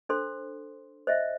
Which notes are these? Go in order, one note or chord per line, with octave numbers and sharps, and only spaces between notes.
D4 A4 C5 C6
C5 D#5 E5